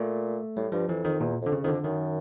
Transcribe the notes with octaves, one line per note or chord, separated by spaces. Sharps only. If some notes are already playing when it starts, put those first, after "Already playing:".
Already playing: A#2 A3
A2 G3
G2 F3
F2 E3
F2 D#3
E2 A#2
F2
D3
C#3
F2 D3 D#3
F#2 D#3